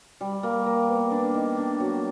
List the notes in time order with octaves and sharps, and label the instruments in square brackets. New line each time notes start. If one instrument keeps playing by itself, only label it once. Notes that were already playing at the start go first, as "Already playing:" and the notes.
[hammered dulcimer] G3
A#3
A#3
B3
D4
D#3
D4
F#3